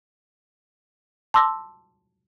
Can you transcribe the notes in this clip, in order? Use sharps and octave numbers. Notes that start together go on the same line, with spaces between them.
A5 C6 D6 E6 A#6